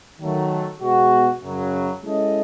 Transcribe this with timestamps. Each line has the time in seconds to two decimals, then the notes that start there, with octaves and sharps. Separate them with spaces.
0.19 D#3 F#3 A3
0.80 B2 G#3 B3 F#4
1.42 F#2 C#3 F#3
2.03 G#3 C#4 E4 A4 D#5